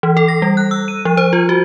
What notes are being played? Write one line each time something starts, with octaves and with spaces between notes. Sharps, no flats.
E3
A4
A#6
G3
F#6
E6
D#7
F3
C5
F4
F#4